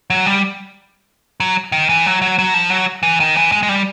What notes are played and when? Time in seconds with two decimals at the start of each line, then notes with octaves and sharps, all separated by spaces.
0.10 F#3
0.26 G3
1.40 F#3
1.72 D#3
1.89 E3
2.06 F#3
2.22 F#3
2.39 F#3
2.54 F3
2.70 F#3
3.03 E3
3.20 D#3
3.36 E3
3.52 G#3
3.63 G#3
3.69 G3